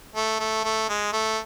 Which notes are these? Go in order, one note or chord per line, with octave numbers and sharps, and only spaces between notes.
A3
A3
A3
G#3
A3